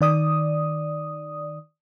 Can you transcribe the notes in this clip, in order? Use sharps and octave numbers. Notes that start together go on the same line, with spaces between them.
D#3 D5 D#6